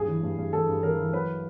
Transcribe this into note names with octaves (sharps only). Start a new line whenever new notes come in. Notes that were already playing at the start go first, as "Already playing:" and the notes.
Already playing: G2 F#3 G#4
E3
G2
G2
E3 A4
G2
E3 A#4
E3
F#3 B4